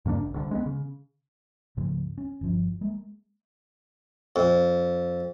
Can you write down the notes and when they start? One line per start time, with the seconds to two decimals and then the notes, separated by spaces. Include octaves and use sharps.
0.05 G2 C#3 A#3 D4
0.21 G#1
0.34 C2 D3
0.51 G#3 A#3 B3
0.66 C#3
1.77 G#2 C#3 F3 A3
2.18 C#4
2.41 G1 F3
2.81 G#3 A#3
4.36 F2